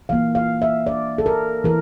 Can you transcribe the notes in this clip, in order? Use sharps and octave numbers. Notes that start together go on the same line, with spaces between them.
E3 A#3 F5
F5
E5
D5
A4
A#4
E3 A#4